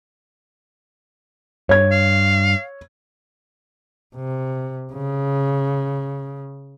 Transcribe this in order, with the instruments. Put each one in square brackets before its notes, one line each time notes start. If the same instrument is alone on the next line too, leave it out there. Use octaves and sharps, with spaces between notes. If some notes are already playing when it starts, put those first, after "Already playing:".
[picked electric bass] G2 [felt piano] C#5 G#6
[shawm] F5
[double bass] C3
C#3